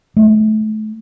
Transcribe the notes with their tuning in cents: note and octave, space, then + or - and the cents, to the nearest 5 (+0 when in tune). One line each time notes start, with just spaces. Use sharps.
A3 -30